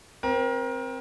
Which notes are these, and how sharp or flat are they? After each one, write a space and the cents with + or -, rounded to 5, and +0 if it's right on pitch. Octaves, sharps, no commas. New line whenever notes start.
C4 +5 A#4 +30